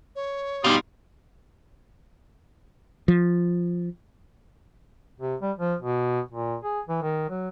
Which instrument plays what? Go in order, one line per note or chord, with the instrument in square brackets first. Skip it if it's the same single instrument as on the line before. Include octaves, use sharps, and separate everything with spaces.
[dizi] C#5
[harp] B2 D#4 C6 [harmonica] G3 F5 D#6 [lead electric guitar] F4 G4
[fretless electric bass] F3
[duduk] C3
G3
F3
B2
A#2
G#4
E3
D#3
F#3